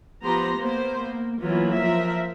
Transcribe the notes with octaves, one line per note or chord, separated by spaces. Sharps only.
F3 B3 G4 C5 A#5 C6
A#3 B3 C5
A#3
E3 F#3 A#3 B3 F4
F3 A#4 E5